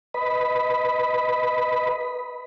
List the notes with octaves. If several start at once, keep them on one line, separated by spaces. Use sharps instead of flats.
B4 D#5 B5